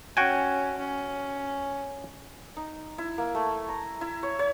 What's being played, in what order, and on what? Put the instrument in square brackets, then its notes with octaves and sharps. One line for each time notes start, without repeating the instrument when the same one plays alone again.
[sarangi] C#4 [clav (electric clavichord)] F#4 G5 G#5
[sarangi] C#4
[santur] D#4
E4
A#3
A3
A#5
E4
C#5
C#5